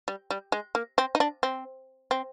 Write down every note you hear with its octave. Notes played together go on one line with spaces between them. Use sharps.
G3
G3
G#3
A#3
C4
D#4
D4
C4
C4